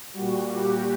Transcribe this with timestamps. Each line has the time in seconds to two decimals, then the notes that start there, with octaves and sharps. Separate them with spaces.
0.13 A#2 G3 F#4
0.51 G4